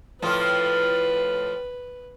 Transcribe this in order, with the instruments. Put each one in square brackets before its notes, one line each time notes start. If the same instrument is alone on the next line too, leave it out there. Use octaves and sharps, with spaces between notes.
[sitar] A2 F3 F4 [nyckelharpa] B4